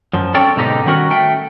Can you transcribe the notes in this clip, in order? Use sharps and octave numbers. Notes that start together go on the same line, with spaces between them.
F#2 F3
C4 C#4 A4 D5 G5
G#2 B2 D3 D#4 G4
D#3 G3 C#4 F#4 A#4
A3 G5